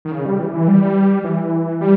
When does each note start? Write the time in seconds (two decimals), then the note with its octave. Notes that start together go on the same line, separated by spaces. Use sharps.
0.05 D#3
0.11 C#3
0.26 G3
0.40 E3
0.54 E3
0.68 G3
1.24 E3
1.81 G3